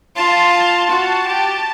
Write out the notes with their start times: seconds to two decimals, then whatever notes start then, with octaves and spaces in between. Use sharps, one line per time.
0.16 F4 A5
0.53 A5
0.90 F#4
1.26 G4